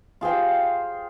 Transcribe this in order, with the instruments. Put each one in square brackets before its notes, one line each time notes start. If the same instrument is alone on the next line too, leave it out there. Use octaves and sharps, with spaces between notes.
[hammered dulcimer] F4 G#4 C5 G5